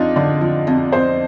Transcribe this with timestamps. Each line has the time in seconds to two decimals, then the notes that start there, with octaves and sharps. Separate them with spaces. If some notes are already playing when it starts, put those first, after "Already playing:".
Already playing: F2 D4 D#4 F4
0.16 D3 D5
0.41 F3
0.67 F2 D#5
0.92 F2 C5